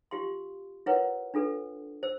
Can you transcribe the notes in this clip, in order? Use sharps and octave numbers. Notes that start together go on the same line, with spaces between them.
F4 G4 F5 C6
E4 F4 A#4 B4 C#5 F#5
D4 F4 A4 B4
C5 E6